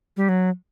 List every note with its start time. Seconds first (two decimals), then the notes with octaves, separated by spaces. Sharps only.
0.17 G3
0.29 F#3